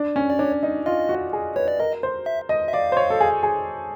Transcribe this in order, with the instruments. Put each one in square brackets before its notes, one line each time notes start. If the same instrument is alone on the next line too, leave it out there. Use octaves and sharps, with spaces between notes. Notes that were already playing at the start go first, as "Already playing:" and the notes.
Already playing: [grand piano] D4
C#4
[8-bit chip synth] D5
[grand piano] D4 [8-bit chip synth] C#5
[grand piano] D#4
[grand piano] F4 [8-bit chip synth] D#5
[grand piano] F#4
G#4
[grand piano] B4 [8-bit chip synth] C#5
[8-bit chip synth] D5
[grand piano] A#4 [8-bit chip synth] D#5
[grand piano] C5
[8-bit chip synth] E5
[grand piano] D#5
[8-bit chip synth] E5
[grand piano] D5 [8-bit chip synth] F5
[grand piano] C5
C#5
A4
G#4
G#4